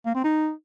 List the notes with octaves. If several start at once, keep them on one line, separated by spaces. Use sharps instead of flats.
A#3
C4
D#4